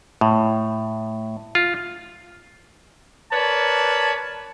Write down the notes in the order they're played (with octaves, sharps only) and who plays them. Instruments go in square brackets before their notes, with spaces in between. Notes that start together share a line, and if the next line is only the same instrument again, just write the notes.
[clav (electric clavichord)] A2
F4
[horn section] A#4 B4 C#5 D5 A5